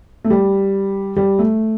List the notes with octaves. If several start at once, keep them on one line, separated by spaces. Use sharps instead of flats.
A3
G3
G3
A3